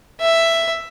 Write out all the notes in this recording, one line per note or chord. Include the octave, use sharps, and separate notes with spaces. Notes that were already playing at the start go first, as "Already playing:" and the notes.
E5